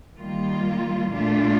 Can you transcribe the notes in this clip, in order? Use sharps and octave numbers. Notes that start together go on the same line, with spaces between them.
D#3 G3 A#3 F4
A#2 A3 D4 F4